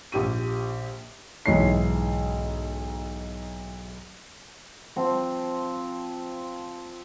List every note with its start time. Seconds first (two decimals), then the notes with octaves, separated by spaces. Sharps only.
0.12 A#1 G4 D#7
1.46 B1 G#2 E3 C#5 C7
4.96 F3 C4